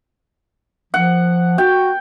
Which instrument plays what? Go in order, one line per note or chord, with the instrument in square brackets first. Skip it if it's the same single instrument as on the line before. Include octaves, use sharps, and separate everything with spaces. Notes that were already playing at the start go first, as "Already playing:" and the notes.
[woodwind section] F3 [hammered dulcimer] F#5
[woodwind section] F#4 [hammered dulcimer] G5